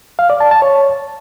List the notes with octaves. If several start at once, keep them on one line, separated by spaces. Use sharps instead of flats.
F5
D5
A5
A5
C#5